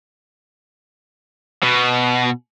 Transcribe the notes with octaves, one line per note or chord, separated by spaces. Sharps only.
B2